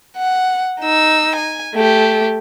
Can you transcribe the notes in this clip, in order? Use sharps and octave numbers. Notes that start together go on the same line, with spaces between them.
F#5
D#4 E6
G#5
A3 G4